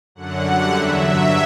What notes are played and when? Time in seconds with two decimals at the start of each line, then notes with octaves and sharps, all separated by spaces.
0.15 F#2 D3 F#3 F#5
0.43 F#2 D3 G3
0.73 E2 D3 F#3 E5
1.01 G2 F#3